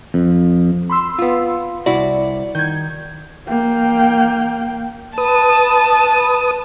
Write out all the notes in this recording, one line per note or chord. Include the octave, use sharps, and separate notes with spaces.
F2
B5 C6 E6
B3 F4
C2 E4 F#4 D5
D#3 G6 G#6
A#3 G5
B4 A5 D#6